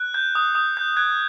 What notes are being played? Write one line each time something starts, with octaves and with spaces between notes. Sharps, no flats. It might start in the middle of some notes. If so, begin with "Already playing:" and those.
Already playing: F#6
G6
D#6
D#6
G6
F#6 G#6